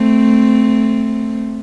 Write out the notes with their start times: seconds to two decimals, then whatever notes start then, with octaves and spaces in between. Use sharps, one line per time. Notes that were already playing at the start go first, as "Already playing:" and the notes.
Already playing: A3 C4